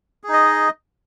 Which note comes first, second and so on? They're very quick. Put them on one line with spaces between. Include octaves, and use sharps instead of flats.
G#4 D#4 D#5